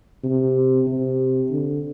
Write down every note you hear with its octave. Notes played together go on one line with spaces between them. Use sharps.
C3
C3
D3